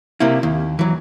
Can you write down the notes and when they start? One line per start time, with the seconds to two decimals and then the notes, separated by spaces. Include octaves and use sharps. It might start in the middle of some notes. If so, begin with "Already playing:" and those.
0.20 C3 A#3 E4
0.43 D#2
0.79 E3 F#3